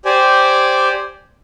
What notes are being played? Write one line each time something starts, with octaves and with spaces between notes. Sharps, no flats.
G4 C5 D5 G#5